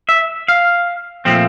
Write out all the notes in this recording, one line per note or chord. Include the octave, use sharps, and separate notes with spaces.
E5
F5
A#2 F3 A3 C4